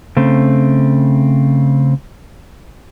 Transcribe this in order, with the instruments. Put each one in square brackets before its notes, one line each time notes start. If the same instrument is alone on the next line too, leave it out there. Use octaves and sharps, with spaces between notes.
[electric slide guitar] C#3 A3 C4